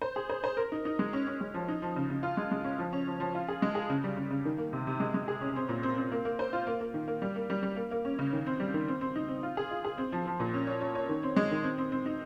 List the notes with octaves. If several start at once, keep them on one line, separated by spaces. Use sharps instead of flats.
C5
G#4
C5
C5
A#4
D#4
D#4
G#3
C#4
C#4
G#3
F3
D#4
F3
C#3
C#3
F4
G#3
G#3
C#4
F3
C#4
F3
F3
F4
G#4
G#3
G#4
C#3
G3
C#3
C#3
D#3
A#3
C3
C3
G#3
G#3
G#4
C#4
C4
A#2
C4
C4
A#3
A#3
C5
F4
A#3
A#3
D#3
A#3
G3
A#3
G3
G3
A#3
A#3
C#4
C#3
D#3
C4
G3
D#3
C4
C4
D#4
C4
F4
G#4
F4
G#4
C4
F3
F3
A#2
C#4
C#5
C#5
C#5
D#3
C4
G#3
D#3
C4
C4
C4
D#4